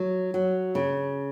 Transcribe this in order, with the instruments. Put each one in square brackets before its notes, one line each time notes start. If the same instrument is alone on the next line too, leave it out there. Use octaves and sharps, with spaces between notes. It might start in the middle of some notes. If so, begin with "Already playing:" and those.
Already playing: [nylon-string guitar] F#3
F#3
C#3